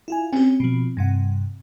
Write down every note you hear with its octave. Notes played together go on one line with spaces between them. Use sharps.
E4 F4 G#5
C4 C#4 G4
B2 F3
G2 C3 F#5